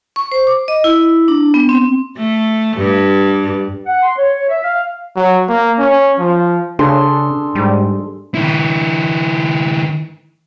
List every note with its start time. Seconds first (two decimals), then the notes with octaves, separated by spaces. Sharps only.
0.16 C#6
0.32 C5
0.47 D6
0.68 D#5
0.84 E4
1.28 D4
1.54 B3
1.69 C4
2.17 A3
2.77 G2
3.86 F#5
4.03 C6
4.17 C#5
4.49 E5
4.64 F5
5.16 F#3
5.48 A#3
5.79 C#4
6.19 F3
6.79 C#3 D4 G#4 A4 C6
7.55 G#2 G3
8.35 D#3 E4